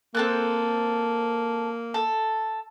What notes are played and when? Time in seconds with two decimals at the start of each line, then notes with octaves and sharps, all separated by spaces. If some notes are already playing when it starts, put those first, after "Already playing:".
0.15 A#3 C4 A4 F#6
1.94 A4